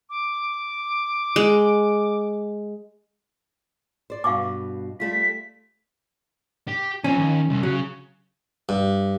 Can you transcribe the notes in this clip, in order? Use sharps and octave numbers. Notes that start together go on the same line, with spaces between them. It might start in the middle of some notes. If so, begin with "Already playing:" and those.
D6
G#3
C5 D5
G2 B2 F5 C#6 D6
G3 A3 F4 B6
G4
F3 C4 C#4
D#2
C2
C#3 F#3
G2